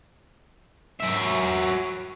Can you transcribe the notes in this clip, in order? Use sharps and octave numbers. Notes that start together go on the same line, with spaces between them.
F#3 E5